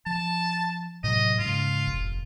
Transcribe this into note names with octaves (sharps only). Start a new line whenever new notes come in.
F3 A5
A2 C3 F#3 D#5
G#2 C#3 F4
F1 A#1